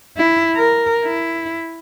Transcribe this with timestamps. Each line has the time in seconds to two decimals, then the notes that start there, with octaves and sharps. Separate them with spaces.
0.17 E4
0.55 A#4
1.04 E4